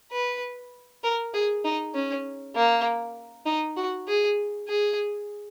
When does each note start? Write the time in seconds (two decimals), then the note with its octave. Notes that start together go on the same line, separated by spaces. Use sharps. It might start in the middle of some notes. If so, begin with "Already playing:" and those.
0.12 B4
1.03 A#4
1.34 G#4
1.64 D#4
1.94 C#4
2.56 A#3
3.46 D#4
3.77 F#4
4.08 G#4
4.68 G#4